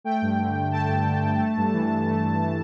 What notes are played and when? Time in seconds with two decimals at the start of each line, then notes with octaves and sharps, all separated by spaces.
0.04 A3 G5
0.22 G2
0.38 D3
0.56 G2
0.71 A3 A5
0.88 G2
1.05 D3
1.22 G2
1.39 A3
1.57 G2
1.73 E3
1.89 G2
2.07 A3
2.24 G2
2.41 E3